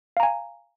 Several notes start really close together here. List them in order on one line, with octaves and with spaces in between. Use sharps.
F5 A#5 G#5